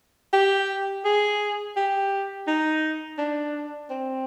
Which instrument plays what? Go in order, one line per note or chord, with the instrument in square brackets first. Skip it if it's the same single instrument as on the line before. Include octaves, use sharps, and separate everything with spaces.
[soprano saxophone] G4
G#4
G4
D#4
D4
C4